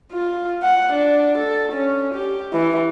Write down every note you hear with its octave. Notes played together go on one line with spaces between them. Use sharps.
F4
F#5
D4
A4
C#4
G4
E3